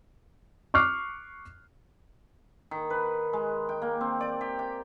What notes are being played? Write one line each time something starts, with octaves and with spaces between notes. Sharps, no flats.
C#6 D6 F6 F#6 C7
D#3
B4
G#3
G5
A#3
C4
D5
G4
G5